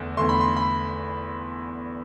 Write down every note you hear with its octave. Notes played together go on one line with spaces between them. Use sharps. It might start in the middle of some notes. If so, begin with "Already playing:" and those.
Already playing: E2 D3 A3
E2 D3 A3 C6
B5
C6
B5